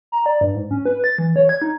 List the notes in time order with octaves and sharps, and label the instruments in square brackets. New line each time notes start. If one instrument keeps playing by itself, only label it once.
[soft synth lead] A#5
D5
G2
G#2
C#4
B4
A6
E3
C#5
G#6
D#4